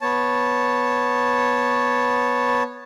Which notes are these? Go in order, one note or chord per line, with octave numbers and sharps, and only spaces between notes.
B3 C#5 A5